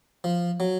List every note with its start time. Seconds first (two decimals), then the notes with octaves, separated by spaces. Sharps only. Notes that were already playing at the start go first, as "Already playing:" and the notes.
0.24 F3
0.60 F#3